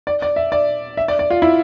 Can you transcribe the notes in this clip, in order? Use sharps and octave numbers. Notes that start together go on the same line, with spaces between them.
D5
D5
E5
D5
E5
D5
D5
F4
E4